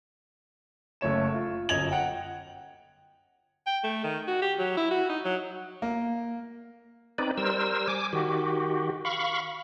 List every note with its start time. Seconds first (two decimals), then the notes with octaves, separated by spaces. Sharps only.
1.01 F#1 A3 C#5 E7
1.34 F4
1.69 G1 F#2 D#5 G#6 F7 F#7
1.91 F#5 G5
3.66 G5
3.84 A3
4.04 D#3
4.28 F#4
4.42 G4
4.59 F#3
4.77 E4
4.91 F#4
5.09 D#4
5.25 F#3
5.82 A#3
7.18 C4 D#4 B4 D5
7.38 G3 A#4 C5 E6
7.88 G#5 D6
8.13 D#3 F#4 G4
9.05 F5 B5 C#6